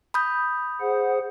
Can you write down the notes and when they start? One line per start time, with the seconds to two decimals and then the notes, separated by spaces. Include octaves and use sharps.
0.14 B5 D#6 G6
0.80 G#4 C5 F#5